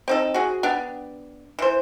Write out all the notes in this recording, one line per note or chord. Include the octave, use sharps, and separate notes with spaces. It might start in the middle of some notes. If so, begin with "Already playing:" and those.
C4 D#4 A4
F#4 G#4
B3 D4 G4
E3 C5